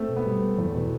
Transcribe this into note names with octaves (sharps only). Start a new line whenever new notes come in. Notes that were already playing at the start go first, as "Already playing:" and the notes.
Already playing: A3 C4
B2
B3
G3
B3
E2
B2